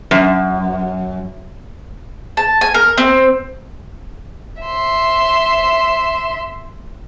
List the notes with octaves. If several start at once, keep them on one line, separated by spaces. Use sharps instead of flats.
F#2
A5
G#5
A#4
C4
E5 C6